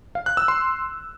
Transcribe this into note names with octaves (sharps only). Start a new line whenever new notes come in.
F5
F#6
E6
C6